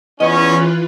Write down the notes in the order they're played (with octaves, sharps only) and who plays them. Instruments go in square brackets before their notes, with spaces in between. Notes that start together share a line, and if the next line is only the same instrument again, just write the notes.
[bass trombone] E2 [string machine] E3 F4 B4 [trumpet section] C#4 [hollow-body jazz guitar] D#5